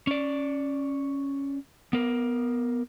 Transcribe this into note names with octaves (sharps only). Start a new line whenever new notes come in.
C#4 D5
B3 A#4